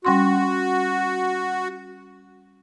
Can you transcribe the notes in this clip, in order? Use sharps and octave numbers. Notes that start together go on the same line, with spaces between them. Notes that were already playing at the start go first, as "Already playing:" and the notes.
G3 C#4 F#4 C6